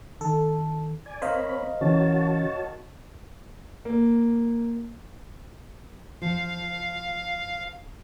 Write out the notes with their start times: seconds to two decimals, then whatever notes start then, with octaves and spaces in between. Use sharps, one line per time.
0.21 D#3 A4
1.06 D5 G#5
1.22 C4 A#4 C5 C#5 D#5 F5 B5
1.81 C#3 E3 C#4 F#4 C#5 A5
3.85 A#3
6.22 F3 F5